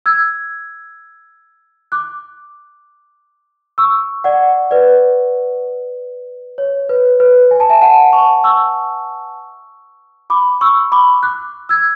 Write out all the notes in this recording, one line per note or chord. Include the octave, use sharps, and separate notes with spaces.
E6 G#6
D6 F#6
C#6 E6
D5 F#5
B4 D5
C#5
B4
B4
G#5
A5
E5 G#5
F#5 A5
A5 C#6
C#6 E6
B5 D6
C#6 E6
B5 D6
D6 F#6
E6 G#6